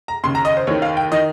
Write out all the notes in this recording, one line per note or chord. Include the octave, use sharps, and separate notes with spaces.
A#5
D#2 C#3 C6
A#5
D#5
C5
D#2 D#3 C#5
F5
G5
D#3 D#5